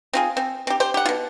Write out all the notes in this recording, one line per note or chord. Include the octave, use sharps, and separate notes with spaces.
C4 F4 G#4
C4
C4 G4
G4 C5
G4 F#5
B2 F4